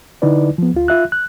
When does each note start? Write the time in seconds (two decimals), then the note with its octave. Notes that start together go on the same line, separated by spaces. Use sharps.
0.22 D3 D#4 E4 B4 D5
0.58 F3 B3
0.74 D2 F4
0.88 F4 E5 F#6
1.12 F#6